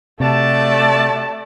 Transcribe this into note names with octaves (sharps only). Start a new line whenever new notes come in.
C3 A3 F#4 G4 D5 A5